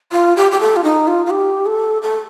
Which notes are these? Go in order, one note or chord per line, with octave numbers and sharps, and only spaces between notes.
F4
G4
G4
A4
F4
D#4
F4
F4
G4
A4
A4